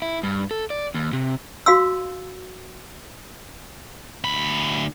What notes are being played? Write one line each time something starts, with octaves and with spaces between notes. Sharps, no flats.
E4
G2
A4
D5
D#2
C3
F#4 F5 C6 E6
D2 B5